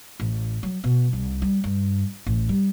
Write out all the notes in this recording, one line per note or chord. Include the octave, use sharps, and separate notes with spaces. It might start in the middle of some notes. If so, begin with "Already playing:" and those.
A1
F#3
B2
C2
G3
G2
A1
G3